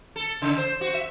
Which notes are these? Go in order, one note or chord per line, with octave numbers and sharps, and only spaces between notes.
A4
C#3
C5
F#4
E5